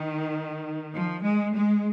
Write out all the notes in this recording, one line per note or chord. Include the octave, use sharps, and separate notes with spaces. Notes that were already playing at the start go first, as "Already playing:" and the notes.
Already playing: D#3
F3
G#3
G#3